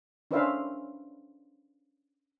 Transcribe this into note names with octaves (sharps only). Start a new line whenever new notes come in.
C#4 D4 B4 C5 E5 F5